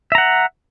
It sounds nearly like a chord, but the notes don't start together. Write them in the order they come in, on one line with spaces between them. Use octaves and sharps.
E5 A#5 F#5